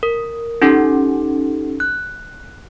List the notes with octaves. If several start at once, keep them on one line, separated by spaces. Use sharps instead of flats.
A#4
C#4 D#4 G4 A4
F#6